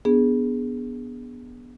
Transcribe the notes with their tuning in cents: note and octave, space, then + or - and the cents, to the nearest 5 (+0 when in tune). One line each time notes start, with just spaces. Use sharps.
B3 -10 D4 -15 G#4 +0